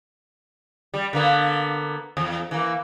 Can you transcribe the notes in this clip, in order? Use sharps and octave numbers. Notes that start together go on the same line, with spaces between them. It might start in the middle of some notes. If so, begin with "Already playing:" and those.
G3
D3 A#3 B3
E2
E3 A#3